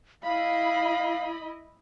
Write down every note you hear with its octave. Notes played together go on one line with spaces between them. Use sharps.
E4 D#5 F5 B5